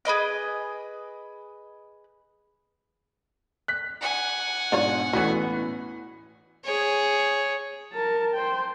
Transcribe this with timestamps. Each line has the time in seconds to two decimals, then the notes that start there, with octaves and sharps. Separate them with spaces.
0.05 G#4 B4 D#5 D6
3.68 F#6 B6
4.01 F#5 G#5
4.72 G#2 B2 D4 F4 C#5
5.13 A2 E3 B3 C#4 F#4
6.65 G#4 C#5
7.93 A#4 A5
8.34 C5 G5